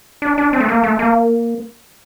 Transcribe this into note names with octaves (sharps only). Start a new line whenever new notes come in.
D4
D4
C4
A3
A#3
A3
A#3